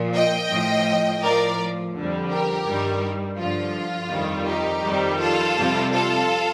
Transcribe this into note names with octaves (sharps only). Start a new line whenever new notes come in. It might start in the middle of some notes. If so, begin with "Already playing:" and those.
Already playing: A#2 F3
D#5 G5
A2 F3
A2 F3 A#4 D5
F2 D3 G3
G4 A#4
G2 D#3 G3
G2 D3 F3 F4
F2 D#3 G3
D#4 G4
F2 D#3 G3
F4 A4
F2 C3 G3
F4 A4